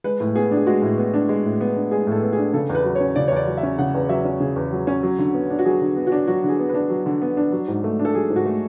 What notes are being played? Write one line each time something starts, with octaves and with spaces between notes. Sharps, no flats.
G#3 B4
A2
B3 G#4
D4
G#4
G#3 F#4
A2
B3
D4
G#3
A2
B3
D4
G#3 G#4
A2 A4
B3
G#4
D4
C#3 A4
E2
B4
F#3
C#5
C#4
C#3 D5
C#5
E2 D5
F#3
E5
C#4
C#3 F#5
E2
F#3 E5
C#4
C#3 G#4
E2
F#3
C#4
F#3
D3
B3
D4
F#4
F#3 G#4
D3
B3
F#4
D4
F#3 F#4
D3
G#4
B3
B4
D4
F#3
D3
B3
D4
F#3
G#2
A3
D4
A4
F#3 G#4
G#2
F#4
A3